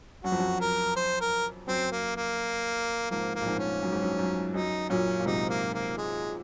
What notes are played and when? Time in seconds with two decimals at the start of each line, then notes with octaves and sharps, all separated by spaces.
0.24 F#2 F#4
0.32 F2
0.39 F#2
0.61 A#4
0.96 C5
1.21 A#4
1.67 F#2 C4
1.91 A#3
2.16 A#3
3.10 F2 G#2 A#3
3.35 A#3
3.41 A#2
3.46 F2 G#2
3.59 C#4
3.83 F#2
3.92 G#2
4.03 F#2
4.19 F#2
4.54 F#2 D#4
4.90 F#2 A#2 C#4
5.20 A#2
5.25 G#2 C3 D#4
5.50 A#3
5.74 A#3
5.98 G#3